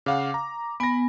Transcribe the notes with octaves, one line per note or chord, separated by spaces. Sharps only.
C#3 F5 F#5 D6
A#5
B3 G#5 B5 A#6